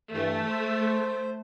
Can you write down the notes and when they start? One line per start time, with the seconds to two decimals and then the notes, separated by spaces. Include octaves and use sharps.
0.12 G2 E3 A3
0.48 C5